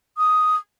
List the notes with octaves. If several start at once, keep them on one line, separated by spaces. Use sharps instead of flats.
D#6